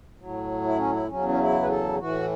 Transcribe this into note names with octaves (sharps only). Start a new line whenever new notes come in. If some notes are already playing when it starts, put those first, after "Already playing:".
A2 F#3
E4
C#4
E4
E2 C#3 F#3 C#4
C#4
E4
B4
A4
A2 E3 F#4